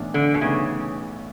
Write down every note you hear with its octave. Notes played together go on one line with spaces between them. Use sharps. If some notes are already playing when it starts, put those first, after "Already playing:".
Already playing: B1 A2 E3 B3 D4
D3
B2
B1 A2 C#3 E3 B3 D4